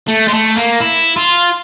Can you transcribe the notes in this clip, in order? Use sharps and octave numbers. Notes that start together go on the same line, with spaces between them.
A3
G#3
A3
A#3
E4
F4